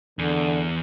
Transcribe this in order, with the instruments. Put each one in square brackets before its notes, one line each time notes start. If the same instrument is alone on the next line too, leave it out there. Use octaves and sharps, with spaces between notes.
[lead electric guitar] E2 [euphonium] D3